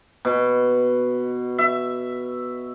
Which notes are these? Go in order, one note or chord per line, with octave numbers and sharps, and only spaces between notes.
B2
E5